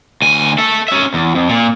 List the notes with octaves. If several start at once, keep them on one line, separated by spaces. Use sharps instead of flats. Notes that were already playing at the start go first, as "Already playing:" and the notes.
D2 G#5
A4 E5
C#4 E5
E2
F2
A#2